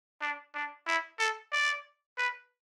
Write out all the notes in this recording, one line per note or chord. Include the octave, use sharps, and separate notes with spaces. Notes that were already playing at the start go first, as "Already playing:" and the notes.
D4
D4
E4
A4
D5
B4